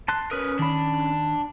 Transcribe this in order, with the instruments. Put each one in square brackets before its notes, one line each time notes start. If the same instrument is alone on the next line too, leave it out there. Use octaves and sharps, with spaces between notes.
[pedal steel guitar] A5 C6 F#6
[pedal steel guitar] C#4 D#6 [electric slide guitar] A#4 B4
[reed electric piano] D#3 B5 [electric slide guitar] D4